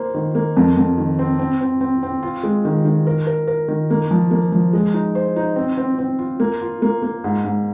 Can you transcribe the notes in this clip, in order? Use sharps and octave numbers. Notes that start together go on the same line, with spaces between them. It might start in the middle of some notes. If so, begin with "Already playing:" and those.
Already playing: A#3 C5
D#3
A#3
F2
F2
D#3
C4
C4
C4
C4
C4
F4
G#3
D#3
D#3
A#4
A#4
A#4
D#3
A#3
F3
A#3
F3
G#3
D#4
C5
D#4
C4
C4
C4
F4
A#3
F4
A#3
A#3
G#2
G#2